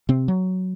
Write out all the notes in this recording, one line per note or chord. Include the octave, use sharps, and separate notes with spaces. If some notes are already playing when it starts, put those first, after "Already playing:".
C3 C4
F#3